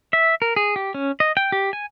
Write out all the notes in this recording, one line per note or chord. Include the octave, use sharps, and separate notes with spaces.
E5
A#4
G#4
G4
C#4
D#5
G5
G4
G#5